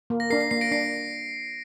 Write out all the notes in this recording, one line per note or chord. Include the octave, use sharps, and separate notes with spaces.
A#3
A#6
D4 A#4 C7
C7
A#3 C7
A#6 D7
D4 C7